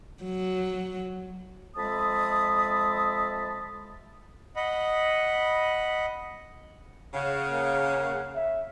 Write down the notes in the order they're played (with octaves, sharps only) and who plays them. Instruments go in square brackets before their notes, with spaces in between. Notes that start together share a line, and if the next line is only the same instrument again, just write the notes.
[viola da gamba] F#3
[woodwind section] F2 G#3 E5 A5 B5 D#6
[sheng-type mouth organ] D#5 F#5 B5
[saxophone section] C#3 [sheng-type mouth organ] F5 F#5
[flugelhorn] A#3
E5